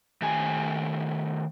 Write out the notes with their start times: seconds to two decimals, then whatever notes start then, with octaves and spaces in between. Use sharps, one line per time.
0.22 D#3 A3 G4 G#5